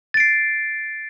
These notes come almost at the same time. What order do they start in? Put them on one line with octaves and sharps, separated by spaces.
A6 D7 C7